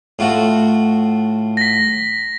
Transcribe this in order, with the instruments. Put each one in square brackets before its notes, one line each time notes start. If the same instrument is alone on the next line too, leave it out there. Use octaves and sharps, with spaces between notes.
[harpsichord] A2 F4 F#4
[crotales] A#6 B6